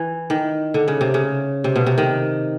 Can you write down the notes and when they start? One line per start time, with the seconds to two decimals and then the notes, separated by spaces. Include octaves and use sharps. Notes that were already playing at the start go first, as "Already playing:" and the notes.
Already playing: E3
0.30 D#3
0.74 D3
0.88 C#3
1.01 C3
1.14 C#3
1.64 C3
1.76 B2
1.86 C3
1.98 D#3